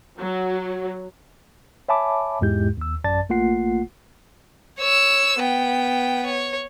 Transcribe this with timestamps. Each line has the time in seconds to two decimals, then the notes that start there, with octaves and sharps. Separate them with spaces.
0.19 F#3
1.89 C#5 E5 G#5 A5 B5 D6
2.41 E2 G#2 G#3 E4 G4 G6
2.78 D#2 E6
3.04 A1 F#2 D5 A5 A6
3.29 A#1 A3 A#3 F4 F#5 C7
4.79 C#5 E6
5.40 B3 G5
6.26 C#5